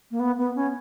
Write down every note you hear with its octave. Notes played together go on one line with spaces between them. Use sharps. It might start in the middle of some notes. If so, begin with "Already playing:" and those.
A#3
B3
B3
C#4